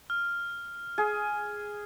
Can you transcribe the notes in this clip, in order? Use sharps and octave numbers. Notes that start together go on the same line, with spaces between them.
F6
G#4